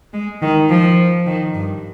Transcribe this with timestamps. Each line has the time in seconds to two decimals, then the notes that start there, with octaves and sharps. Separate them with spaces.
0.14 G#3
0.42 D#3
0.70 F3
1.27 D#3
1.55 G2